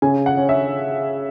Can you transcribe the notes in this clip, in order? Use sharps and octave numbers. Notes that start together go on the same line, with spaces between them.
C#3 G#5
F#5
C#4
E5